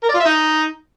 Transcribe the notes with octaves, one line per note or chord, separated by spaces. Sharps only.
A#4
D5
F4
E5
D#4